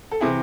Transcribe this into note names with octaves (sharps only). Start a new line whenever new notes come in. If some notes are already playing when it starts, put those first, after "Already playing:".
A4
C3 E3 E4 G#4